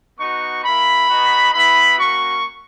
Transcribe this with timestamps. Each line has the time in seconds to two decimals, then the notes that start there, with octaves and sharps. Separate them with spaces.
0.20 B3 D#4 F#4 C#6
0.64 A#3 E4 B5
1.09 B3 D#4 F#4
1.54 B3 E4 B5
1.98 A#3 C#4 F#4 C#6